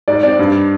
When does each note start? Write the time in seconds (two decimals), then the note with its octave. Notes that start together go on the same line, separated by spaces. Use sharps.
0.08 G#2 D5
0.23 C4 D5
0.39 G2